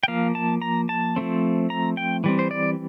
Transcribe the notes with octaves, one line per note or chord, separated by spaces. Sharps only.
G5
F3 A#3 F5
A5
A#5
A5
F3 A3 C4
A#5
G5
E3 G3 C4
C5
D5